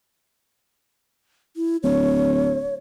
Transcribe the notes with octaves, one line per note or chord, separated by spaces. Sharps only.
E4
D1 C#5